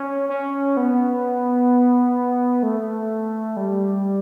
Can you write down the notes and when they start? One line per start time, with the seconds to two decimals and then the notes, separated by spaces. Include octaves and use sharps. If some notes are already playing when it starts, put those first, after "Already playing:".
Already playing: C#4
0.29 C#4
0.77 B3
2.63 A3
3.57 G3